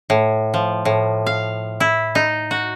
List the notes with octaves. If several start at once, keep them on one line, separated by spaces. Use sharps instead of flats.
A2
F3
A2
F5
E4
D#4
F#4